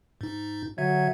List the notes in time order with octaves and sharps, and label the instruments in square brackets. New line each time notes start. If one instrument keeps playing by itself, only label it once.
[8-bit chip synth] G#2 D#4
[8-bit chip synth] D3 E5 G#6 [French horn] F#3